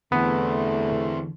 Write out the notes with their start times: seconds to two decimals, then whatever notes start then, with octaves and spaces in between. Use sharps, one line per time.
0.12 E2 D3 E3 A3 B3 C4 E4